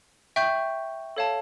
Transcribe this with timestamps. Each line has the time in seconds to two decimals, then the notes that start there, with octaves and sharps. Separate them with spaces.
0.36 E5 G5 C#6 G6
1.17 A4 C#5 F5 A5